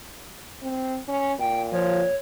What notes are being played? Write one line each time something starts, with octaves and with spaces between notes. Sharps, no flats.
C4
C#4
A#2 G5
F3 C#5